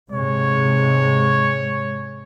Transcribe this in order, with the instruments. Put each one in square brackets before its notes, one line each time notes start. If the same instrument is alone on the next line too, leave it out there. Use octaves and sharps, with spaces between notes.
[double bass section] G#2 C3 G#3 [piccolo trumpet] C#5